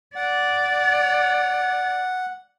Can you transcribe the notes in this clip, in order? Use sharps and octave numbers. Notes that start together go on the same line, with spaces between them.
D5 F#5